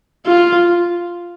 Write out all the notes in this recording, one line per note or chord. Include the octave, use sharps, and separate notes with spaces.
F4